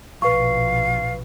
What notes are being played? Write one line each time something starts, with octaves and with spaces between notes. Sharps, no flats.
A#1 B2 B4 F5 C#6